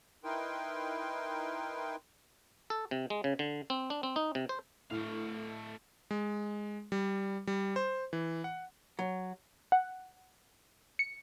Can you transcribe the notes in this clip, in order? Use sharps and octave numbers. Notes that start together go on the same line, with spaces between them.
D#4 E4 A#4 B4 G5 C6
A4
C3
G#3
C#3
D3
C4
D4
C4
D#4
C3
C5
A2 A3 F5
G#3
G3
G3
C5
E3
F#5
F#3
F#5
C#7